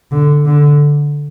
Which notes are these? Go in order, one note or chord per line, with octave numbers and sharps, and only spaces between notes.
D3
D3